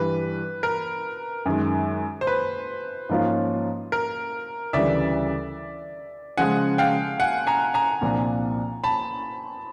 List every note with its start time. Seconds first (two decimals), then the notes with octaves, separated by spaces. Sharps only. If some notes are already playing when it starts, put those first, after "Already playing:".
Already playing: G2 E3 G3 B4
0.63 A#4
1.46 F#2 D#3 G#3
2.21 C5
2.27 B4
3.09 G#2 F3 A#3 C#4 F4
3.92 A#4
4.73 D2 C#3 E3 G3 D5 E5
6.38 C#3 F3 G#3 F#5 G#5
6.78 F5 G5
7.20 F#5 G#5
7.47 G#5 A#5
7.74 G#5 A#5
8.01 C2 A#2 F3 A#3 D4
8.84 A5 B5